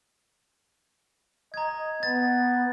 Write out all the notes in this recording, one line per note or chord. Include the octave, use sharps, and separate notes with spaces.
D#5 A#5 G#6
B3 A6